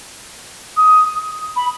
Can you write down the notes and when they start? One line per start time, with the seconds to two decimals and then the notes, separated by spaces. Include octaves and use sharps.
0.77 D#6
1.56 B5